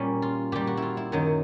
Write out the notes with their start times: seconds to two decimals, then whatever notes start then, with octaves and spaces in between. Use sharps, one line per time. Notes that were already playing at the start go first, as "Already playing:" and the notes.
Already playing: A#2 G3 C#4
0.22 F4
0.52 A#2 G3 G4
0.67 F#4
0.77 E4 F4
0.97 E4
1.12 F#2 D#3 F#3